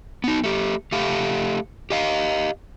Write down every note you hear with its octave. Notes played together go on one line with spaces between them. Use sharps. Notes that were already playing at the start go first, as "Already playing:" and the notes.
B3 D#4
A3 G4
A3 G4 F5
G4 D#5 F5